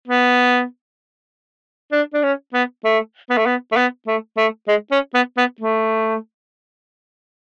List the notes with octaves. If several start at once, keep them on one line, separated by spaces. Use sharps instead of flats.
B3
D4
D4
C#4
B3
A3
B3
A3
B3
A3
B3
A3
A3
G#3
C#4
B3
B3
A3